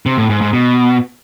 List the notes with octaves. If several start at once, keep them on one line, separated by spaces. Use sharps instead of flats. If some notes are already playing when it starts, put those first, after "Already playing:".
C3
A2
G#2
G#2
B2